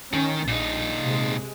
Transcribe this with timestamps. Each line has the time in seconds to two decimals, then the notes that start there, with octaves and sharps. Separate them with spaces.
0.13 D#3 C#4
0.48 A#1 A#2 D#4
1.03 C3 G#3